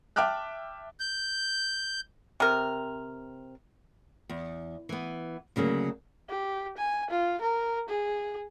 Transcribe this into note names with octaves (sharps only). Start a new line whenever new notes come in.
E5 G5 A5 D6 F6 F#6
G6
C3 A#4
E2
E3 B3
D2 C#3 F#3 A#3
G4
G#5
F4
A#4
G#4